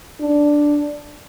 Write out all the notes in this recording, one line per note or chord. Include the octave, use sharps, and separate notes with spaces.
D4